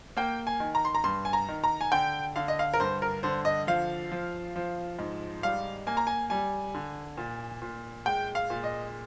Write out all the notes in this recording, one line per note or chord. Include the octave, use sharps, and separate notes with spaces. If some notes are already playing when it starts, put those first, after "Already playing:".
A#3 G5
G#5
D#3
A#5
C6
A#5
G2 C6
G#5
A#5
D#3
A#5
G#5
D3 G5
D3 F5
D#5
F5
A#4
G2 C5
A#4
D3 C5
D#5
F3 F5
F3
F3
G#2
G3 F5
A#3 G#5
A#5
G#5
G3 G#5
D3
A#2
A#2
G#3 G5
F5
A#2
D#5